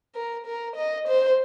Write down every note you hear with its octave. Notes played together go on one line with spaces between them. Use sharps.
A#4
A#4
D#5
C5